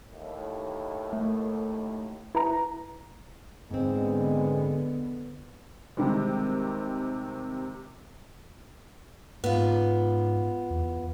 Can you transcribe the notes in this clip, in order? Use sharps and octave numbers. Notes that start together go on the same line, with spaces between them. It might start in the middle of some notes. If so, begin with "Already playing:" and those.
D#2 A2
A3
E4 B4 A#5
G#2 D3 G#3 B3 C4
C3 D#3 G3 G#3
G#2 B3 F4
E2